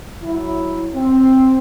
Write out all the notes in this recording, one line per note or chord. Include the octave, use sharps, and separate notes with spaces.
F#3 E4
C4